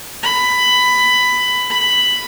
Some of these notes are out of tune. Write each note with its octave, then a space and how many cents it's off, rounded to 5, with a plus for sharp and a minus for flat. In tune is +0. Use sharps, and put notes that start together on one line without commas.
B5 +15
B5 +5